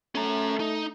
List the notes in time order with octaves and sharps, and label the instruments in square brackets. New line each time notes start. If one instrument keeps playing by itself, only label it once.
[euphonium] A3 [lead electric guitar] C#4 A#5
[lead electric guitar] D#4